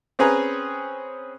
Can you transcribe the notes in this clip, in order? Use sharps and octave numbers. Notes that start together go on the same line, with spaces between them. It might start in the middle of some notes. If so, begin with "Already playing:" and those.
C4 C#4 G#4 B4 G#5 A#5